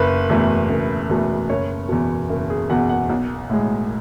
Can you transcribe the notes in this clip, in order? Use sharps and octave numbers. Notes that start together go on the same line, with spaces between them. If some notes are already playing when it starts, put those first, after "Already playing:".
Already playing: F#1 B4
E2 B2 A3
F#1
E2 B2 A3
F#1 C#5
E2 B2
F#1
G#4
E2 B2 F#5
F#5
B1
A2 G#3